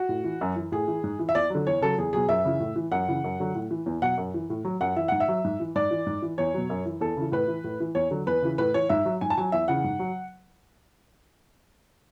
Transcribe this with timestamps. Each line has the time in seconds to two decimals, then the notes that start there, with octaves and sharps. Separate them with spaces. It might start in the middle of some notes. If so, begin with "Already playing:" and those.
Already playing: F#4
0.09 A2
0.24 E3
0.41 F#2
0.56 E3
0.72 A2 G#4
0.88 E3
1.04 G#2
1.19 E3
1.29 E5
1.35 E2 D5
1.50 D3 F#3
1.67 E2 C#5
1.81 C#3 F#3 A4
1.98 E2 G#4
2.13 B2 F#3 G#4
2.29 F#2 E5
2.45 C#3 E3
2.60 A2
2.76 E3
2.92 F#2 F#5
3.08 C#3 E3
3.24 F#2
3.40 D3 F#3
3.55 A2
3.71 E3
3.86 E2
4.02 B2 F#3 F#5
4.18 F#2
4.34 E3
4.50 A2
4.65 F#3
4.81 F#2 F#5
4.96 E3 E5
5.08 G#2 F#5
5.20 E5
5.28 F#3
5.44 G#2
5.60 E3
5.75 G#2 D5
5.91 E3
6.06 G#2
6.22 E3
6.38 E2 C#5
6.54 B2 F#3
6.70 F#2
6.86 E3
7.01 E2 A4
7.17 C#3 E3
7.32 A2 B4
7.48 E3
7.64 A2
7.80 E3
7.95 E2 C#5
8.11 D3 F#3
8.26 E2 B4
8.42 C#3 E3
8.58 A2 B4
8.74 E3 C#5
8.89 G#2 E5
9.05 F#3
9.21 G#2 G#5
9.30 A5
9.38 F#3 G#5
9.52 E2 E5
9.68 C#3 E3 F#5
9.84 G#2
9.99 F#3